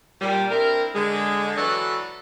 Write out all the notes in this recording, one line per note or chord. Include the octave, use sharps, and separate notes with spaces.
A#2 G3
C4 D4 E4 A#4
D3 G#3
E3 F#3 F#4 A4 B4 D5